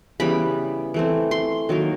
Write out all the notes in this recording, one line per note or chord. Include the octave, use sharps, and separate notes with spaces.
C#3 E3 G3 B3 B5
E3 A3 C4
C6
D#3 F#3 A#3